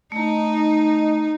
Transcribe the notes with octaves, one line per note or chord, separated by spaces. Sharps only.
A3 D#4 A#5